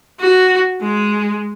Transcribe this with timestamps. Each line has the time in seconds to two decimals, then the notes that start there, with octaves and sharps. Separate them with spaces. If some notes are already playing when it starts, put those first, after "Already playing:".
0.20 F#4
0.82 G#3